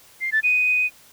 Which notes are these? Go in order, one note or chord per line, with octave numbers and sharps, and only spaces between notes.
C7
A6
D#7